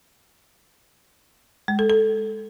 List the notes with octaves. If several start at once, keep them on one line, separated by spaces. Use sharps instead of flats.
G#3
A4
A4